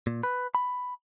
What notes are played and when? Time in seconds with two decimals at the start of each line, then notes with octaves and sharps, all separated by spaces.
0.07 A#2
0.23 B4
0.55 B5